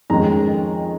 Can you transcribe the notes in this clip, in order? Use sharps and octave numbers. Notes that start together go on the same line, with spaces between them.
F2 D#3 G#3 C#4 A#5